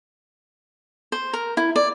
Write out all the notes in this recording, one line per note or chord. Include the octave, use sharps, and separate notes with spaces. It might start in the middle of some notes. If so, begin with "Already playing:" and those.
C5
A#4
E4
D5